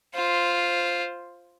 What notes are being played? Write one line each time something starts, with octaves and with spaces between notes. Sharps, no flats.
F4 C5